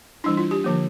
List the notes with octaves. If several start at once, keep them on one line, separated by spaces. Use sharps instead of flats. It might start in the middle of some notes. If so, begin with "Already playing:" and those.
E3 G3 D4 E4
F4
G4
D3 F3 A#3